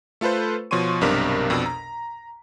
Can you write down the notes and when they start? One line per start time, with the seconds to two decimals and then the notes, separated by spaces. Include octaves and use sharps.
0.21 A3 F4 A4 B4 C5
0.71 B2 F3 C#5 C6 C#6 D#7
1.01 B1 G2 C3 D4 A#4 B6
1.50 F2 B2 D4 E6
1.66 A#5